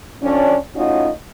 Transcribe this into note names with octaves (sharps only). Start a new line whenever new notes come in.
F2 C#4 D4
A2 C#4 D#4 F4 F#4 D#5